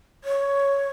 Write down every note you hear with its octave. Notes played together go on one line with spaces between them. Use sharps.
C#5